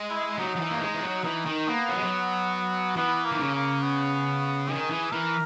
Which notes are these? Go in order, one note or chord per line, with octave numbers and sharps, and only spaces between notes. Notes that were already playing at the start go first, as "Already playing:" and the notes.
Already playing: G#3
E4
F#3 D#4
F#3
E3
A#3
G#3
E3
F#3
E3 D#4
D#3
A#3 B3
F#3
G#3
F#3
E3 B3
A#3
D#3
C#3
A#3
B3
D#3 G#4
E3
E3 A#4